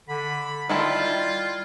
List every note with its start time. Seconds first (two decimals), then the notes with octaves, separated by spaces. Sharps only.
0.09 D3 B5
0.69 D#3 G3 E4 F4 A5 C6 G#6 F#7